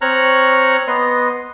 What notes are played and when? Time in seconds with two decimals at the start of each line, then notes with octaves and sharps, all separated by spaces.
0.01 C4 C#5 A#5 C#6 F6 F#6
0.87 B3 D#5 C6